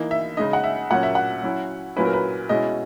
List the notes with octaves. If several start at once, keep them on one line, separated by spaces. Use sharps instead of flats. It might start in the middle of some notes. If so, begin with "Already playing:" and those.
Already playing: E3 A#3 D#4
E5
C#3 G#3 D#4 D#5
F#5
E5
A#2 F#3 A#3 C#4 F#5
E5
F#5
F#3 C#4 E4
A#2 F#3 C#4 E4 B4
A#4
B4
B2 G#3 C#4 E4 D#5